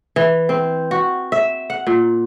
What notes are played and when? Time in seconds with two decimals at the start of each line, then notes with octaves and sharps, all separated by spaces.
0.16 E3
0.49 C4
0.91 F#4
1.32 E5
1.70 F#5
1.87 A#2